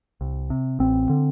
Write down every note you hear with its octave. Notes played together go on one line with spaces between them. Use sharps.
C2
C3
A1 C4
D3